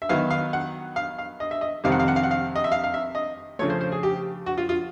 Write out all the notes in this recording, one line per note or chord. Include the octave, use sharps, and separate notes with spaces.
E5
D#3 F#3 B3 D#4 F5
F5
F#5
F5
F5
D#5
E5
D#5
F2 C3 D#3 G3 C4 F5
F#5
F5
F#5
F5
F#5
F5
D#5
E5
F5
F5
E5
D#5
C#3 F3 A3 C#5
C5
C5
G#4
G4
F#4
F4
F4